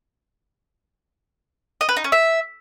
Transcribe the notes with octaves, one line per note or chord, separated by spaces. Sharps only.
D#5
B4
D#4
C#4
E5